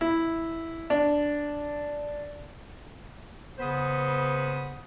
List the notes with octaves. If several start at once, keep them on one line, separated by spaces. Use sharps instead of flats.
E4
D4
C#3 B3 B4 C5 D#6